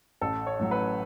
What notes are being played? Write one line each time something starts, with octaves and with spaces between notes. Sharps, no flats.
A1 A4
C#5
A2 F#3
B4